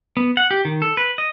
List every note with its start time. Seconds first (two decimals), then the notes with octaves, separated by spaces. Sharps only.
0.17 B3
0.37 F#5
0.51 G4
0.65 D#3
0.82 A4
0.97 B4
1.18 D#5